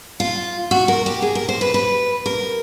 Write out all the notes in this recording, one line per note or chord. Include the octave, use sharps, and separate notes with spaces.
F4
F#4
A#4
G4
G#4
A#4
C5
B4
B4
A#4